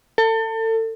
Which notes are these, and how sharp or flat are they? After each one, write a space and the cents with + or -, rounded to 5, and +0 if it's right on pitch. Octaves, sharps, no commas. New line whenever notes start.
A4 +30